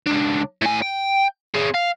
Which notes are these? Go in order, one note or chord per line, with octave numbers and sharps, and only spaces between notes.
C#2 D4
A2 G#5
G5
C4 G#4
F5